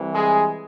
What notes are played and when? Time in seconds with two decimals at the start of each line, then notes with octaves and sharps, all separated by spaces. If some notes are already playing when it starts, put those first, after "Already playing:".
Already playing: C2 C3 E3
0.12 G#3 G#4